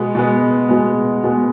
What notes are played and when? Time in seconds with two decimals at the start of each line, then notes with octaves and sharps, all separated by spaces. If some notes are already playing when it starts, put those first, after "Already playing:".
Already playing: B2 G#3 B3
0.15 B2 G#3 B3
0.69 B2 G#3 B3
1.24 B2 G#3 B3